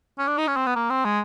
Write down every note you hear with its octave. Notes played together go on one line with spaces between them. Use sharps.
C#4
D4
D#4
C#4
C4
B3
A#3
C4
G#3